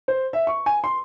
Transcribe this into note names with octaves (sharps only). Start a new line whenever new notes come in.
C5
E5
C#6
G#5
C6